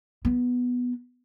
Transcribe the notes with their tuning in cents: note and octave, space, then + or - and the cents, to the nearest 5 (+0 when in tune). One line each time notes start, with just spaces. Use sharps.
B3 -5